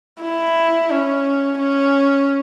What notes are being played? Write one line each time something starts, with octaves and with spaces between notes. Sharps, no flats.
E4
C#4
C#4